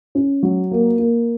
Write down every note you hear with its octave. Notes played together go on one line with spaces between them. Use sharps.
C#4
F#3
A#3
A#3